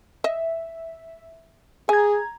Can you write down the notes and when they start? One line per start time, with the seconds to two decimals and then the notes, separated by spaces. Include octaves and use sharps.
0.24 D#5 E5
1.89 G#4 G#5 A#5 G#6